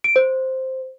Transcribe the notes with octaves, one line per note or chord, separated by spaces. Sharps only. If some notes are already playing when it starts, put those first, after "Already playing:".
D7
C5